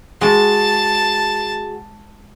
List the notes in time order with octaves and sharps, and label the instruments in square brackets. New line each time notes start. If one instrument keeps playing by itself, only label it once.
[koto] G#3 [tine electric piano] F#4 G#4 [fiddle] A5